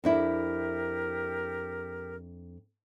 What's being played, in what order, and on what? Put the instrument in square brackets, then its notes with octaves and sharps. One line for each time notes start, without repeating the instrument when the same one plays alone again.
[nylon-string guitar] F2 D4 E4 [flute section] G4 A#4